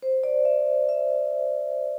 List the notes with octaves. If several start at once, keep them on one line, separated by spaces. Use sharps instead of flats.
C5
D5
E5
E5